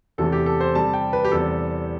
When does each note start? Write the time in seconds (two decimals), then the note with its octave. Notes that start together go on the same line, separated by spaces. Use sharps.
0.18 E2 C3 E3 A3 A4
0.32 G4
0.46 A4
0.61 C5
0.75 C3 G3 C4 A5
0.94 G5
1.13 B4
1.25 G4
1.32 E2 C3 G3 C4 A4